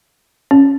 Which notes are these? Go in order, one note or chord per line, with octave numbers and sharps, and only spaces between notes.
C#4